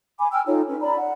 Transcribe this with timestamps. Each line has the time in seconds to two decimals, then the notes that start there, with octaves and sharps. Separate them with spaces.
0.19 G#5 B5 D6
0.33 G5 G#5 E6 F6
0.46 D#4 F4 A4 C#5
0.68 C#4 B4
0.81 D5 A#5 B5
0.97 F#5